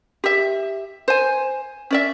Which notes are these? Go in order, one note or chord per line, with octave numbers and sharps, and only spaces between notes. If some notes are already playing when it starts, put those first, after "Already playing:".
G4 E5
C5 G#5
C#4 D5 E5